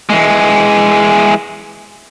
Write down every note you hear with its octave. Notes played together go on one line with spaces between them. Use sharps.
E3 G#3